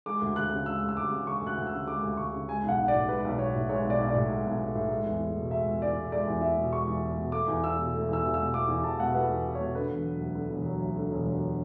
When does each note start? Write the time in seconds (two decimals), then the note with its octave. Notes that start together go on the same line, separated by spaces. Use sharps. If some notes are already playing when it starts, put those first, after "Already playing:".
0.06 G#3 D6
0.22 D2
0.36 D2 F#6
0.52 C#3
0.66 G#3 E6
0.82 D2
0.89 E6
0.97 D2 D6
1.11 C#3
1.27 G#3 C#6
1.42 D2
1.47 F#6
1.57 D2
1.67 E6
1.72 C#3
1.87 G#3 D6
2.02 D2
2.17 D2 C#6
2.32 C#3
2.49 G#3 G#5
2.63 B1
2.68 F#5
2.78 B1
2.88 D5
2.94 A2
3.09 G#3 B4
3.25 B1
3.39 B1 C#5
3.55 A2
3.69 G#3 C#5
3.85 B1
3.90 D5
4.00 B1
4.09 D5
4.14 A2
4.30 G#3
4.46 B1
4.60 B1
4.75 A2
4.90 G#3
5.06 E2
5.20 E2
5.37 B2
5.51 G#3 E5
5.67 E2
5.81 E2 D5
5.97 B2
6.12 G#3 D5
6.27 E2
6.41 E2 E5
6.58 B2
6.72 G#3 C#6
6.88 E2
7.02 E2
7.18 B2
7.32 A3 D6
7.48 E2
7.64 E2 E6
7.78 B2
7.94 A3
8.09 E2 E6
8.23 E2
8.34 E6
8.39 B2
8.53 A3 D6
8.68 E2
8.84 E2 A5
9.00 B2 F#5
9.14 A3 B4
9.29 E2
9.45 E2
9.55 C#5
9.60 B2
9.75 D3 B4
9.90 E1
10.05 F#3
10.20 D2
10.35 D3
10.51 E1
10.66 F#3
10.82 D2
10.96 D3
11.11 E1
11.27 F#3